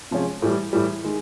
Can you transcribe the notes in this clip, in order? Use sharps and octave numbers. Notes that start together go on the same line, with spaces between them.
C3 F3 G#3 C#4 F4
A2 E3 G3
A2 E3 G3
D#3 G#3